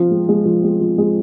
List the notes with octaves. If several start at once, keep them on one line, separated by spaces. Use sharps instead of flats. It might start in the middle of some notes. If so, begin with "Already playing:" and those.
Already playing: F3 C4
G#3
G#3
F3
G#3
F3
G#3